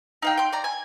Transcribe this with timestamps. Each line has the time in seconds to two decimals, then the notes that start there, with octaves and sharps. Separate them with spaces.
0.22 D#4 F5 G5
0.37 G5 C6
0.52 D5 A#5
0.64 G#5